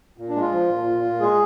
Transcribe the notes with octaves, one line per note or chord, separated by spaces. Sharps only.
A#2
D4
G#3
F4
F3
A#2
A#2
A#2
G#3 G#4